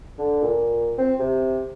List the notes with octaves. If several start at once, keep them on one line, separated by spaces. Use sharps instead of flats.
D3
A#2
C4
C3